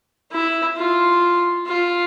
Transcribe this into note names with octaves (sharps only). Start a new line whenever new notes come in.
E4
F4
F4